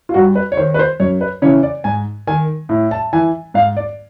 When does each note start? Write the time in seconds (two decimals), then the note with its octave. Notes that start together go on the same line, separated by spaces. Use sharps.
0.09 F4
0.14 G2 F#4
0.35 B4
0.52 C#5
0.57 D#3 C5
0.74 B4
0.79 C5
1.00 F#2 C#5
1.21 B4
1.42 C#3 E3 C#5
1.63 D5
1.84 G#2 G#5
2.27 D#3 G#5
2.69 A2
2.91 A5
3.13 E3 G#5
3.54 G#2 F5
3.77 D5